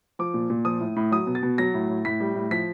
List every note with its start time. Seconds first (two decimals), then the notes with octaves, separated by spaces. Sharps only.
0.19 F3 D6
0.34 A#2
0.50 A#2
0.65 F3 D#6
0.80 A2
0.96 A2
1.12 F#3 D#6
1.27 B2
1.35 A6
1.43 B2
1.58 F#3 A#6
1.74 A2
1.90 A2
2.05 A2 B6
2.20 G3
2.35 A2
2.51 F3 B6